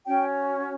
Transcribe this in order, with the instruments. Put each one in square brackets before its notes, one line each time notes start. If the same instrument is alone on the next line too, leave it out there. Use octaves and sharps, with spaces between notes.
[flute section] C#4 F#4 C#5 G5